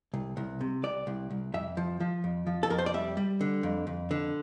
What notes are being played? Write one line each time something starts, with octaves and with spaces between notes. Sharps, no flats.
C2
C2
C3
C2 D5
C2
C2
F2 E5
F3
F3
F2
F3
A4
F2 A#4
C5
D5
G3 E5
G3
D3
F2
F2
D3